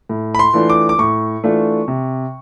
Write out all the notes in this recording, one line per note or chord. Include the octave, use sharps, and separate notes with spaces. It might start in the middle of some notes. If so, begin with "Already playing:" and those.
A2
B5
C6
E3 A3 D4 F4
D6
D6
A2 C#6
E3 A3 D4 F4
C3